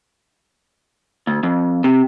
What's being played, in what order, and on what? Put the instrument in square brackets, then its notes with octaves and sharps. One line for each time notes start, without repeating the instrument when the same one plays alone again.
[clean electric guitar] D2
F2
C3